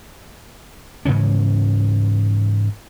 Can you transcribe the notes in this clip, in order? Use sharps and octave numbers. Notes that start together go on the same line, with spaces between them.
G#2 C#3 E3 C#4